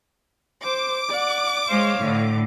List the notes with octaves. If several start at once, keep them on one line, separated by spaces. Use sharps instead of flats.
C5 D6
D5 F#5
G#3 C5 C#5 F5
A2 D3